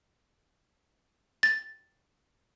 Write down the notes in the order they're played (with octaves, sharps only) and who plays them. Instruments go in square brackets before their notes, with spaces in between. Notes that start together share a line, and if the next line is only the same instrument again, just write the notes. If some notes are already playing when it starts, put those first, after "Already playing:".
[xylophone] A6